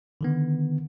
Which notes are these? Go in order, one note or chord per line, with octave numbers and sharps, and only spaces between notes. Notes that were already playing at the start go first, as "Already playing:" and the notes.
D3 D#3 B3